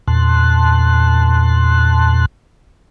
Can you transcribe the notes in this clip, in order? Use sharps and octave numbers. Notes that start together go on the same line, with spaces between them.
E2 A#2 A5 C6 F#6